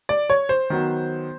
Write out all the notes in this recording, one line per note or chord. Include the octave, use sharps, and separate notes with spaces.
D5
C#5
C5
D#3 F#3 B3